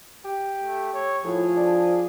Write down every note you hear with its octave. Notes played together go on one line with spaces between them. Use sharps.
G4
A3
C#5
A2 F3 G#4
D4